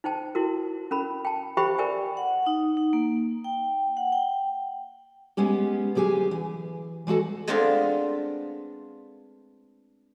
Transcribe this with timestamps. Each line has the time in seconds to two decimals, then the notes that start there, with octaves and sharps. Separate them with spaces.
0.04 D#4 C5 G5 A5
0.35 E4 F#4 A#4
0.91 C#4 A#4 B5
1.25 G5 A5
1.57 G4 C5 E5 G5 B5 C#6
1.78 A#4 D5 E5 G5 G#5
2.17 F#5
2.46 D#4
2.77 D#4
2.93 A#3
3.44 G5
3.97 F#5
4.12 G5
5.37 G#3 B3 C#4 G4
5.95 D2 F#3 G4 G#4 G#5
6.31 E3
7.07 E3 G#3 F#4 A4
7.47 G#3 A3 B3 C4 D4 F4